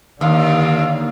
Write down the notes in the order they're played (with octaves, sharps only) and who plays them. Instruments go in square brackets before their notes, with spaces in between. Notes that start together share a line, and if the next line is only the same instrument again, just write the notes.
[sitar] D#2 [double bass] D3 A#3 [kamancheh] F5